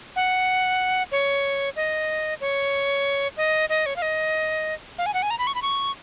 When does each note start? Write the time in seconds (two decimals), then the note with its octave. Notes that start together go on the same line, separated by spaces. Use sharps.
0.16 F#5
1.12 C#5
1.76 D#5
2.41 C#5
3.37 D#5
3.69 D#5
3.86 C#5
3.96 F5
4.02 D#5
4.98 F5
5.06 G#5
5.14 F#5
5.23 G#5
5.30 A#5
5.39 B5
5.47 C#6
5.55 B5
5.62 C#6